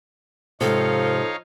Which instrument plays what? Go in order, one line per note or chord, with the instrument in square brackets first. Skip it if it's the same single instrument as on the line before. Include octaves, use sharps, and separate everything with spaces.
[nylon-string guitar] G#2 C3 [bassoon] F3 [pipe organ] D#4 C#5 F5 [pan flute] A4